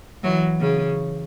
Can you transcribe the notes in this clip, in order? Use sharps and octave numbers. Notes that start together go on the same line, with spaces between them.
E3 F#3
C#3